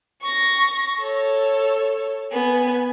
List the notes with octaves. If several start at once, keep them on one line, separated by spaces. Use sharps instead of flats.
C#6 A#6
A4 C#5
B3 G#5